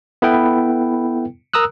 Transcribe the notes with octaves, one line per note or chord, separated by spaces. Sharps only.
B3 E4 A4 B4 G5
A#4 A#5 D#6 E6 F#6